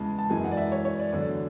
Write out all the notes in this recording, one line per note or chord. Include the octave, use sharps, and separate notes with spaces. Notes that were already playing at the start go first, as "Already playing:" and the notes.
Already playing: E2 C#3 E3 G#3 A5
A5
F#2 E3 G#3 G#5
F#5
D5
E5
C#5
C#5
D5
E2 D3 F#3 D5